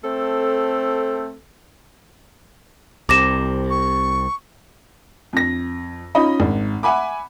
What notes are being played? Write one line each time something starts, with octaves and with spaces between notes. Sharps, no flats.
A3 C4 A4
C2 C3 D6 A#6 E7
C#6
F2 A#6
C#4 D#4 F4 D#5 B5
G#1
E5 F#5 G#5 B5 D6